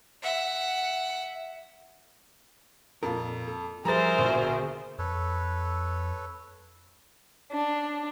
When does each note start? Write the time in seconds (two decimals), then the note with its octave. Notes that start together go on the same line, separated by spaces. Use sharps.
0.23 E5 F#5
3.03 F2 A#2 A4 A#4
3.48 A4
3.85 F3 G3 G#4 A#4 C5 E5 A#5 A6
4.18 A#1 B2 D3
4.99 F2 A4 B4 C#5
7.51 D4